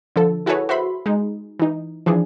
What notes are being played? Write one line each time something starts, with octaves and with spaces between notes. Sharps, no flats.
D3 F3 A4
E4 F#4 G#4 A4 B4 C#5
F#4 C5 E5 B5 C6
G#3 D#4
E3 D#4
E3 F3 D4 G#4